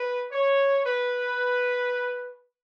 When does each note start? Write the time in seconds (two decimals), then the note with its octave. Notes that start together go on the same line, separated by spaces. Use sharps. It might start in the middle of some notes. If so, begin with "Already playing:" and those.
Already playing: B4
0.31 C#5
0.86 B4